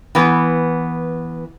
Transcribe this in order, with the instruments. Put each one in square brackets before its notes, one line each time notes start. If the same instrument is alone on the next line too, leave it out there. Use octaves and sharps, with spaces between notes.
[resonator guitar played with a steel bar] E3 B3